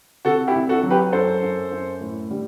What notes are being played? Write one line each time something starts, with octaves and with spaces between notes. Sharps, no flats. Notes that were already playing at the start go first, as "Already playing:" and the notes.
C3 F#4 A4
E4 G4
C2
F#4 A4
F#3
G4 B4
F#2 A4 C5
F#2
F#2
A2
G3